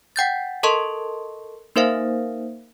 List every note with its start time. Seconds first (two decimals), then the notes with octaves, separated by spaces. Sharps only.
0.16 F#5 G5 G6 A6
0.63 A4 A#4 D#5 A5 C6 C#6
1.76 A#3 D#4 A#4 C5 E5 F5